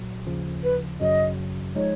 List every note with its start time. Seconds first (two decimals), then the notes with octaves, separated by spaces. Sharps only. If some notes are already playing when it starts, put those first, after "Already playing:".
Already playing: B1 A#2 F#3
0.27 D#2 C#3 F3
0.64 B4
1.00 G#1 F#2 C#3 F#3 D#5
1.76 F3 G#3 D#4 C#5